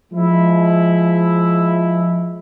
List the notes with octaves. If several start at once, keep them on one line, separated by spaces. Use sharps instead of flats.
F3 G#3 E4